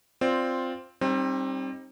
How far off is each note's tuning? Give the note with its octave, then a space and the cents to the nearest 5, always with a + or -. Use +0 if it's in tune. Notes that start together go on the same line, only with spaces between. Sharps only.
C4 +0 F4 +5 D5 +0
G3 +0 C4 +30 D#4 -10